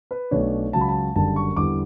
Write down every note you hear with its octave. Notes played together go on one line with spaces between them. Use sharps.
B4
B1 B2 A3 D4 C#5
C#2 C#3 F#3 A5
B5
A5
F#1 F#2 D3 G3 A5
C#6
E2 D3 G3 D6